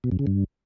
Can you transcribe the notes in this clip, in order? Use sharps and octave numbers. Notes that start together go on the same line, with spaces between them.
B2
F#2
C#3
G2